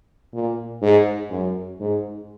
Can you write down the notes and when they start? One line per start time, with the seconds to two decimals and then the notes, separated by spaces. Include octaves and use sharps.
0.33 A#2
0.82 G#2
1.31 F#2
1.80 G#2